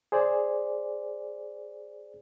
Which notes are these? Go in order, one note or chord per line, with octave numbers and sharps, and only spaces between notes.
G#4 C5 D5